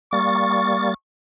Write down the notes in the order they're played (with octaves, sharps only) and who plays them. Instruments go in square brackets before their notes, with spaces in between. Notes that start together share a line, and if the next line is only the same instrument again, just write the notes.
[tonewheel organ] G3 A#3 A6 [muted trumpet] C#6